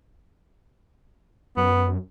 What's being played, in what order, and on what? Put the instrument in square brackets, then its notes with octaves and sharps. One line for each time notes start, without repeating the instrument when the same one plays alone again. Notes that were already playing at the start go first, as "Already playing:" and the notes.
[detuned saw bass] F#2 [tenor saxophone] B3